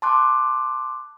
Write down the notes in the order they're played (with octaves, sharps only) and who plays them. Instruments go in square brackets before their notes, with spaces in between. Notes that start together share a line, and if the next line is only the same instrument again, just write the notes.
[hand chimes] A5 C6 D6 F#6